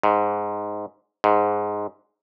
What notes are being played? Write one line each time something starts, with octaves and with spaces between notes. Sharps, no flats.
G#2
G#2